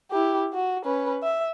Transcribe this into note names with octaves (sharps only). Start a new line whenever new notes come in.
E4 G4
F#4
C#4 B4
E5